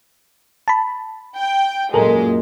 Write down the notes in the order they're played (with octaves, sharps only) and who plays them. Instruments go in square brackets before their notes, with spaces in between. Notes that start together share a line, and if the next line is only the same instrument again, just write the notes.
[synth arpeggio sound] A5 B5
[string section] G5
[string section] F#2 A#2 G#3 [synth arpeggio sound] A4 A#4